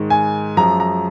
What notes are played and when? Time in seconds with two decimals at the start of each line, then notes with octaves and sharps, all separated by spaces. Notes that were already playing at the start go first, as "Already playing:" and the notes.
Already playing: G#2 D#3 G#3
0.10 G#5
0.57 F#2 F3 G#3 A#5
0.80 A#5